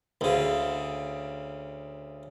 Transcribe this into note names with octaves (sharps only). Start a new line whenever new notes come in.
D2 C#3